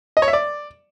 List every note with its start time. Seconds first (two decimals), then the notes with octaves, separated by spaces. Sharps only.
0.17 D#5
0.22 C#5
0.28 E5
0.33 D5